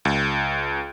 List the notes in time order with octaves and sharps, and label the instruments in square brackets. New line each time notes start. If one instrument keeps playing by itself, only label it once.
[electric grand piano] C#2